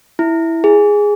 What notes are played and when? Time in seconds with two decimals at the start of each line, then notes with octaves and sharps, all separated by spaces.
0.19 E4
0.64 G#4